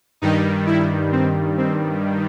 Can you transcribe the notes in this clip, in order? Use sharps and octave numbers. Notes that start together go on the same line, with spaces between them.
G2 D#3 G3 D#4
E4
C4
C4